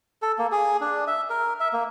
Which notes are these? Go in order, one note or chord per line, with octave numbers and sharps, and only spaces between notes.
A4
A#3
G#4
D4
E5
A#4
E5
A#3